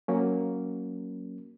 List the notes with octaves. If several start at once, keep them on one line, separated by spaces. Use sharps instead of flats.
F#3 A#3 C#4